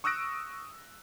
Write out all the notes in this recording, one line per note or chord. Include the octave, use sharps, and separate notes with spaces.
C#6 D#6 E6 F#6 A#6 D7